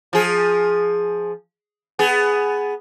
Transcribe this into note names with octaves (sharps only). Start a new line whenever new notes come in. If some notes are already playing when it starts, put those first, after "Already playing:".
F3 G#4
B3 G#4